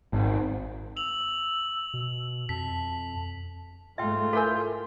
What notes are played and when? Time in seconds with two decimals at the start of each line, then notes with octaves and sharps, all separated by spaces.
0.13 G#1
0.97 E6 F7 F#7
1.94 B2
2.49 F2 A5 B6
3.98 G#2 A3 F4 E5 G5
4.33 E4 A4 A#4 G5 G#5